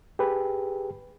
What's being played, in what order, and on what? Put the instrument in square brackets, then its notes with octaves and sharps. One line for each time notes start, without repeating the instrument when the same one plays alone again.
[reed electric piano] G4 G#4 B4